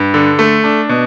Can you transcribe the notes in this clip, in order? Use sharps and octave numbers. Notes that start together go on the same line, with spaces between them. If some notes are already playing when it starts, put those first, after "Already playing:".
Already playing: G2
D3
A3
D4
B2